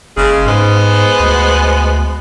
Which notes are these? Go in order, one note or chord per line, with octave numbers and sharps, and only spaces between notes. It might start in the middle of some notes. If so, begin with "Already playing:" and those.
F#1 C#3 G#3 G#4
G#2 G#3 B3 C5
D2